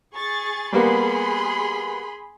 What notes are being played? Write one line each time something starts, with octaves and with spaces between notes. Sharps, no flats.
G#4 C#6 A6
G3 A#3 B3 G#4 B5 C6